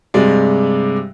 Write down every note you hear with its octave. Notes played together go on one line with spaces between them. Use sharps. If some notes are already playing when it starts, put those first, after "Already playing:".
G2 C3 G#3 D5